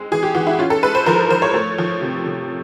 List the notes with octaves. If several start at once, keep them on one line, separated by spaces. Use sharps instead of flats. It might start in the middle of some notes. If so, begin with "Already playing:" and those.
Already playing: G#3 C4
E3 G#4
G4
E3 F#4
E4
C#4 F4
A4
G#3 B4
C5
F3 A#4
F3 C5
C#5
A3
F3
C3
C3